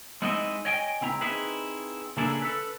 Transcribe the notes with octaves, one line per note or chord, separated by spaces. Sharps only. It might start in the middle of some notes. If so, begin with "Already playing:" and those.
G#3 C4 D#4 E4 F#4 D#5
C#5 D#5 G5 G#5
C#2 C4 E4 A#5
C4 D#4 E4 G#4 B4
C#3 A#3 D4 E4 G#4 A4
A4 B4